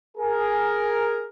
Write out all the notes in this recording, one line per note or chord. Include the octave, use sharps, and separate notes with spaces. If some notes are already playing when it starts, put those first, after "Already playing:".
G#4 A#4